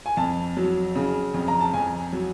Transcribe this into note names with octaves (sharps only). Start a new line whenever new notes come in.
G#5
F2 A5
F#3
C#3
F2
A#5
A5
F2 G#5
F#3